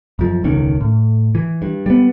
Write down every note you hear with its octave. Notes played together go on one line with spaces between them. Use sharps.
F#2 F3
E1 C#2 D#3 C#4
A2
E3
G2
G3 B3